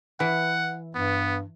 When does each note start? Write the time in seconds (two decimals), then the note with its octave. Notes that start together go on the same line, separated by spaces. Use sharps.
0.20 E3 F#5
0.95 G2 B3